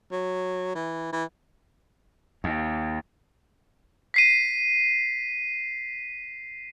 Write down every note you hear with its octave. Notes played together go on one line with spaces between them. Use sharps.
F#3
E3
E3
D#2
B6 C7 D#7